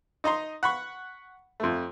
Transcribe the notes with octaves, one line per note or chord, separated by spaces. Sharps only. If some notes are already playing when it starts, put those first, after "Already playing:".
D#4 D#5 A#5 C6
F#5 B5 C#6
F2 A3